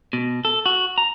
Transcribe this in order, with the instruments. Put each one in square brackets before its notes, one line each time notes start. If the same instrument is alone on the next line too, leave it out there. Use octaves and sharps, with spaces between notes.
[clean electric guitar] B2
A4
F#4
A#5